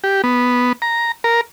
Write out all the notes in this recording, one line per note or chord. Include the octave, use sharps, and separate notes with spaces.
G4
B3
A#5
A#4